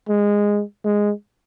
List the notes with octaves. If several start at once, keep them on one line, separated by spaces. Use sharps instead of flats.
G#3
G#3